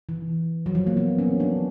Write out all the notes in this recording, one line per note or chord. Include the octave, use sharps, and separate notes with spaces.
E3
F#3
F3
A#3
B3
C#4
D4